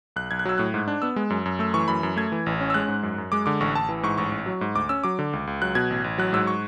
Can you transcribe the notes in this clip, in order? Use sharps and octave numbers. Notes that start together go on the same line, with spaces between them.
B1 F#6
B1 G#6
F#6
F#3 E6
A2 F#6
G#2
D4
B3 E6
G#3
F#2
F#2
A3 E6
E3 C#6
F#2 B5
F#2
A3 G#6
E3
A1
C#4
E6
G#3 F#6
G#2
F#2
F#2
G#3 D6
D3 D6
A1 C#6
A1 A5
E3
G#2 C#6
A1 C#6
A1
F#3
G#2
D2 D6
C#4 E6
F#3 D6
D3
C#2
C#2
F#3 F#6
B2 G#6
A1
A1
F#3 F#6
G#2 E6
C#6